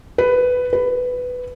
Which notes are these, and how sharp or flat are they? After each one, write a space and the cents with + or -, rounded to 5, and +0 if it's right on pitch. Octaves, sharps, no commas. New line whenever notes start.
B4 +10
B4 +10